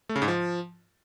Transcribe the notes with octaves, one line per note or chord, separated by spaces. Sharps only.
A3
C#3
G#2
F3